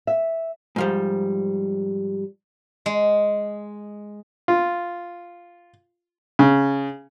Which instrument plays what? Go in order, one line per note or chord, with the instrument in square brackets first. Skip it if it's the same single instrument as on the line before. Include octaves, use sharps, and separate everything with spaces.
[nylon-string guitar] E5
[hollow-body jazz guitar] G#2 F3 G3
[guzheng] G#3
[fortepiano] F4
C#3